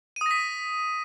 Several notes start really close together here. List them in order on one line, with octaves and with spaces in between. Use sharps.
D#7 D#6 A#6 B6